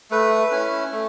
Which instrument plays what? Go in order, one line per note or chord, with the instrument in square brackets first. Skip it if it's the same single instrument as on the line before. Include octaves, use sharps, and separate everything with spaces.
[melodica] A3 B4
C#4 E4
A3